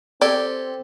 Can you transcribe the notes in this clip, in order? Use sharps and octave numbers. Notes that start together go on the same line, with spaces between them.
C4 G4 A4 D5 G#5